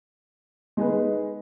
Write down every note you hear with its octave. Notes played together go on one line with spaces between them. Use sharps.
G#3 D#4 G#4 B4